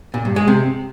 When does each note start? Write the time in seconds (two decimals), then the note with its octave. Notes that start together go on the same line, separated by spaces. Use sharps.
0.14 A#2
0.25 G2
0.36 G#3
0.48 C3